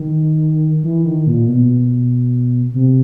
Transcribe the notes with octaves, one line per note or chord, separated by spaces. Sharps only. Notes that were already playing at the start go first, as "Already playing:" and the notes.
Already playing: D#3
E3
D#3
A#2
B2
C3